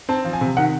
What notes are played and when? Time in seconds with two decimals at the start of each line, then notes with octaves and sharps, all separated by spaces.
0.09 C4 A5
0.25 F3
0.33 G#5
0.41 C3
0.57 D#3 F#5